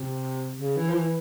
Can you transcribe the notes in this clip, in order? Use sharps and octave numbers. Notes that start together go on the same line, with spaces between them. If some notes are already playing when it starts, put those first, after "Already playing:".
Already playing: C3
C#3
E3
F3
E3